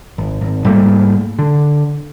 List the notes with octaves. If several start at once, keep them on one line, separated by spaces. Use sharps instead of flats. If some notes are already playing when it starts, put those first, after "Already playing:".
G#1
G#1
G#2 G3 A3 A#3
D3